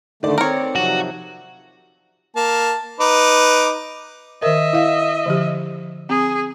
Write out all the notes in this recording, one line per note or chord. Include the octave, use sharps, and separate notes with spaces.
D3 D#3 A3 D5
C4 A#4 C#5
C3 F3 F#3 F#4
A#3 A5
D#4 B4 D6
D#3 A#4 D#5 E5
E4 F5
D3 F3 G4
C4 G#4